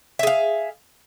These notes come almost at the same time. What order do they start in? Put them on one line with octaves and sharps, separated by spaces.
E5 G#4 F5